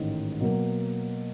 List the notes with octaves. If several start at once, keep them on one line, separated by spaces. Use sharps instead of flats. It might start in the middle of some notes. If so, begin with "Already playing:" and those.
Already playing: A1 G#2 D#3
B2 F#3 A#3